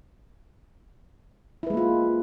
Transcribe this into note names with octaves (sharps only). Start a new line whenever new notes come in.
G#3 A#3 E4 F4 B4